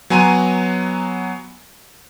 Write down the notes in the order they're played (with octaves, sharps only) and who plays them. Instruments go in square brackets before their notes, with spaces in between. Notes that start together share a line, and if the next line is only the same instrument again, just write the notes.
[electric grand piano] F#3 B3 G#5 A#5 C6 D#7